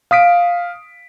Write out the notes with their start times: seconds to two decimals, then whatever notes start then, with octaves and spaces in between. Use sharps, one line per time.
0.11 F5 D#6 B6 D7